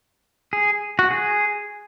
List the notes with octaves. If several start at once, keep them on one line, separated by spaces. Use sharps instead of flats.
G#4
F#4
G#4